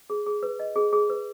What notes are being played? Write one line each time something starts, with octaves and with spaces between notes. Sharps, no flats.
G#4
G#4
B4
D#5
G#4
G#4
B4